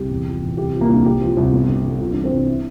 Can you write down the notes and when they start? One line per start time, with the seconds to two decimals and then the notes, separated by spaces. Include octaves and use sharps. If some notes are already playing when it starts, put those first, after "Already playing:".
Already playing: C2 G4
0.09 E2
0.26 F3
0.42 E2
0.57 C2 G4
0.73 F3
0.81 A#3
0.89 C2 D4
1.05 C2 G4
1.21 F3
1.37 C2
1.53 G1
1.69 D3
1.85 G1
2.00 C2 F4
2.13 E3 D4
2.24 C4
2.32 C2 D4
2.48 E4